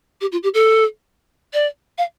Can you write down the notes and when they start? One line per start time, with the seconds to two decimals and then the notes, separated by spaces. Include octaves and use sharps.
0.21 G4
0.32 F4
0.43 G4
0.54 A4
1.53 D5
1.98 F5